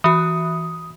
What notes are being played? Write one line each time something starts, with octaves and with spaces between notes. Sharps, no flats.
E3 F#4 D#6